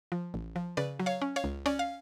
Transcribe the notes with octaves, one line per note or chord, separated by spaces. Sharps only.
F3
A1
F3
C#3 B4 D5
F#3
C#5 F5
C#4
C#5 F5
C#2
C#4 D5
F5